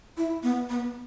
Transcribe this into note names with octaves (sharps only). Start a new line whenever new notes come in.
E4
B3
B3